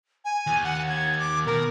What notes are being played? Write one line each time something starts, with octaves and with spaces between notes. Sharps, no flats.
G#5
D#2
F#5
G#6
D6
B2 A#4